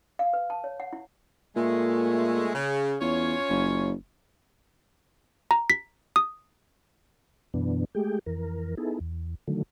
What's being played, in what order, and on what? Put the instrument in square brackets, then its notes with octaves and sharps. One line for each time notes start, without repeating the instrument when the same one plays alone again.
[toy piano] F5
B4
A5
C#5
F#5
E4
[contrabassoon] A#2 [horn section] G#3 A3
[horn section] C#3
[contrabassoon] E2 [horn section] C#4 F4 C#5
[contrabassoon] F#1
[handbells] A#5
B6
D#6
[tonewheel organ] F#2 B2 E3 B3 D4
G#3 A3 G4 G#4 G5
F2 E3 A#4
B3 D#4 E4 G#4 A4
E2
D3 D#3 F#3 A3